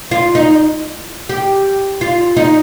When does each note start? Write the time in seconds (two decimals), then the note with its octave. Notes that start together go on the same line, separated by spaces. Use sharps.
0.11 F4
0.35 D#4
1.29 G4
2.01 F4
2.37 D#4